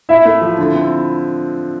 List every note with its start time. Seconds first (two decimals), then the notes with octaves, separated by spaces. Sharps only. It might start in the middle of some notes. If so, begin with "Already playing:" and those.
0.09 A2 E4 E5
0.25 A3
0.41 F3
0.58 D3
0.74 C4